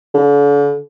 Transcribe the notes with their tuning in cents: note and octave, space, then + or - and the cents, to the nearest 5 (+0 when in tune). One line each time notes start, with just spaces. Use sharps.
D3 -40